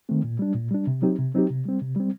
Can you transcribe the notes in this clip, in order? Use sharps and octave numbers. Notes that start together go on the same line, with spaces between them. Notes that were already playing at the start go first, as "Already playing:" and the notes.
D#3 A3 C4
A#2
G3 D4
A#2
G3 D4
C3
F#3 C4 D#4 G4
C3
F#3 C4 D#4 G4
C3
G3 C4
C3
G3 C4